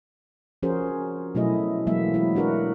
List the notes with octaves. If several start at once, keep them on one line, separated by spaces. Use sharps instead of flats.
F3 C#4 F#4 G#4 A#4 C5
B2 F#3 A3 E4 G#4 D#5
E3 F#3 G#3 A#3 B3 E5
F#3 E4
D4 F#4 A#4 B4